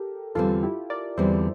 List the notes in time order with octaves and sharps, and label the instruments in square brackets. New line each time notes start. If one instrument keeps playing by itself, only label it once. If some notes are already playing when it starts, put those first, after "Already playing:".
Already playing: [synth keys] G4 A4 A#4
[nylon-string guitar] E2 D3 G3 C4 [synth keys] F4 A4
[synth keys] E4 G4
A#4 D5
[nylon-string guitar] E2 D3 G3 C4 [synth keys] C5 E5